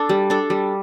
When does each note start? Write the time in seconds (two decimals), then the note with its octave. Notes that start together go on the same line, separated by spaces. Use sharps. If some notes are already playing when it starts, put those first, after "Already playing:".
Already playing: D4 A4
0.09 G3
0.30 D4 A4
0.50 G3